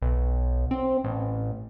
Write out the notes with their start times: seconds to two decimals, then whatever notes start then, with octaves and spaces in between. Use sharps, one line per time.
0.02 B1
0.71 C4
1.04 A1